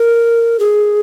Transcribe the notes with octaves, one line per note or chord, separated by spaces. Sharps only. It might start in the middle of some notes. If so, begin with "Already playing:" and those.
Already playing: A#4
G#4